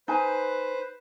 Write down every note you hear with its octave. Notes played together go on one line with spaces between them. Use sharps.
D#4 B4 C5 G#5